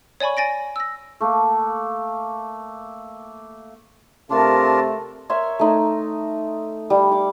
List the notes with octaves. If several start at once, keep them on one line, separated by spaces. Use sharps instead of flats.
C#5 D5 G#5 B5 C#6
G#5 A6 A#6 D7
E6 A#6
A3 A#3
C3 A3 D4 F4 A#4 A5
A#4 C#5 E5 C6
A3 D#4 C6
G3
D6